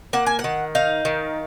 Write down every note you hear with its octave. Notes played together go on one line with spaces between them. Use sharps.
A#3 F#5
G#5
F#5
D#3
D#4 F5
D#3